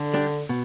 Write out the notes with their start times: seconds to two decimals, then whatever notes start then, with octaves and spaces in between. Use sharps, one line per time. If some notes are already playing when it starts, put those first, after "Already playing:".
Already playing: D3
0.14 G3 D4 G4
0.49 B2